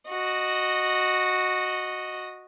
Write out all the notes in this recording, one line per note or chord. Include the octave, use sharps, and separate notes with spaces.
F#4 D#5